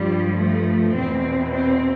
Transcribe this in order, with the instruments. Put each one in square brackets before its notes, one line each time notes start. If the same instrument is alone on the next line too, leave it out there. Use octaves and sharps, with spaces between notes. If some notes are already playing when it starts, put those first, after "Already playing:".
Already playing: [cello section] G2 F3 G3
A3
E2 B2 C4
C4